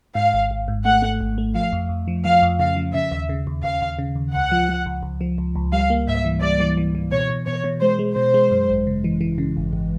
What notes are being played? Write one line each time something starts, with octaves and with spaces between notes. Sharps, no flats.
G#2 F5
G#1
G#1
G#2
A3 F#5
A3
G#1
A3
F3 F5
F2
F2
F3
F3 F5
F2
C#3 F5
F3
C#3 E5
D#2
C#3
D#2
D#2 F5
D#2
C#3
D#2
C#2 F#5
F3
F3
C#2
C#2
F3
C#2
C#2
G3 F5
A#3
G#2 E5
E3
G3 D5
E3
E3
E3
B2 C#5
B2
B2 C#5
B2
G#3 C5
G#3
B2 C5
G#3
F#2
G#1
C#3
E3
E3
C#3
G#1
G#1